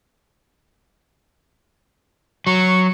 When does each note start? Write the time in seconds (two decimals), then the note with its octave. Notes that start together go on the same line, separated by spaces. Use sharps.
2.47 F#3 C#6